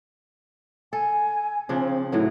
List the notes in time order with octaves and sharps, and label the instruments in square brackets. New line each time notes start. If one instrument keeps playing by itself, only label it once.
[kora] A4 [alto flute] G#5
[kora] C#3 F3 D4 [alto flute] C4
[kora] A2 E3 F#3 [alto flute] D#4